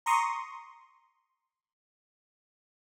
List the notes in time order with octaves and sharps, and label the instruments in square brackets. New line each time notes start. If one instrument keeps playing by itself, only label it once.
[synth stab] A#5 C6 C#6 D#6